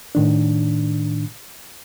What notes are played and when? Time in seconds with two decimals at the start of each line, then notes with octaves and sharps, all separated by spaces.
0.15 A2 D#3 D4